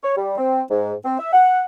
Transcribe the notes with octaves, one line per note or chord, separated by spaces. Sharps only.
C#5
G3
C4
G#2
C4
E5
F#5